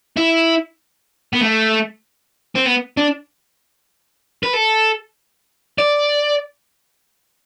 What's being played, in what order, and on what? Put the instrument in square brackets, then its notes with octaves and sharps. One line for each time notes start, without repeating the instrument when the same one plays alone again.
[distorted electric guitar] E4
B3
A3
C4
B3
D4
B4
A4
D5